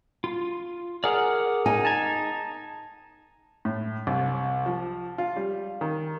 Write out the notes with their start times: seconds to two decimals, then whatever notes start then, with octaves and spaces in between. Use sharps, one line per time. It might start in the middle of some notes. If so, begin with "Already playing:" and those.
0.24 F4
1.04 G#4 A#4 D5 F#5 F6
1.66 D#4 G#5
1.85 A5 A#5 G#6
3.65 A2
4.07 C2
4.66 F3
5.18 F4
5.36 G3
5.81 D#3